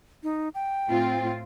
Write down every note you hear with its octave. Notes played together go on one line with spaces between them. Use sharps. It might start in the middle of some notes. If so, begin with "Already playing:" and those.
D#4
G5
A2 C4 F4